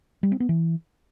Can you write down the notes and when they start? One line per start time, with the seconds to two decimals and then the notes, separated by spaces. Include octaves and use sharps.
0.23 G3
0.32 C4
0.40 B3
0.49 E3